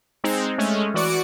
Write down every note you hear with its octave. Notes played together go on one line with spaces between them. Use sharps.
G#3 C4 D#4
G#3 A3 C#4
E3 F#4 D5 F#5 C#7 D7